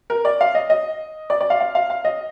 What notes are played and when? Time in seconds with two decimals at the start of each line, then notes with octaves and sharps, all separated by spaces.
0.10 A#4
0.25 D5
0.41 F5
0.55 D#5
0.70 D#5
1.30 D5
1.41 D5
1.50 F5
1.61 F5
1.75 F5
1.90 F5
2.05 D#5